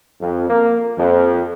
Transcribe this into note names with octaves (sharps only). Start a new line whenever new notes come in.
F2
A#3
F2